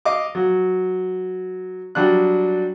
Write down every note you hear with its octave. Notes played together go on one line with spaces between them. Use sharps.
D#5 F5 D6
F#3
F#3 G3 D4 F#6